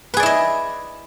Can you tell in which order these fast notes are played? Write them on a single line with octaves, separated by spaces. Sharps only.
B4 G#4 D5 E4 D#5